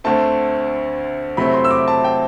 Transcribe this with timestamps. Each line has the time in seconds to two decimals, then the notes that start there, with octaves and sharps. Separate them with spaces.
0.04 D2 D3 A3 C4 A5
1.37 C3 F#3 A3 C4 E4 B5
1.54 C6
1.64 E6
1.71 D6
1.88 A5
2.04 G5